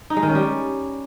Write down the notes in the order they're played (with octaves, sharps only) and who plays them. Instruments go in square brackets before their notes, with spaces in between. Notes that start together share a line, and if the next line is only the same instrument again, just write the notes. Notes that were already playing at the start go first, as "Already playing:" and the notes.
[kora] D#4
G#3
D#3
C#4
G3